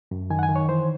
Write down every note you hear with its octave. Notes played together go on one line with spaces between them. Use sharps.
F#2
D#3 G#5
F#5
G#5
D#3
C#5
E3 C5